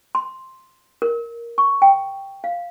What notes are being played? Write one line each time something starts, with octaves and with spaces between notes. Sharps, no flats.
C6
A#4
C#6
G5
F5